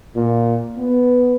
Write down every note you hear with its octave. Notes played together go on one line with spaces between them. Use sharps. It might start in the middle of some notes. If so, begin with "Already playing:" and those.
A#2
B3